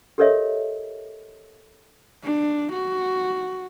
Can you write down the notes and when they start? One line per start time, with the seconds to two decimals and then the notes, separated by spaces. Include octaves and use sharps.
0.18 G4 A4 A#4 C#5 D#5 E5
2.24 D4
2.73 F#4